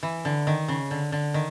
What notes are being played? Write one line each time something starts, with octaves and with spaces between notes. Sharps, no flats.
E3
D3
D#3
C#3
D3
D3
D#3